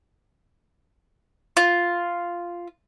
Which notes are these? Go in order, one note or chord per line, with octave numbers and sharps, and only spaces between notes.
F4